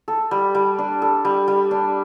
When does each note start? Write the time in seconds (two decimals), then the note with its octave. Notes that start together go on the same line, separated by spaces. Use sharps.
0.08 A4
0.31 G3
0.55 G3
0.78 D4
1.02 A4
1.25 G3
1.48 G3
1.71 D4